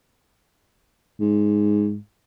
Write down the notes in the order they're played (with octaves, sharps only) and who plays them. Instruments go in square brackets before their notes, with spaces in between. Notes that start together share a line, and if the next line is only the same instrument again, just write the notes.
[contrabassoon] G#2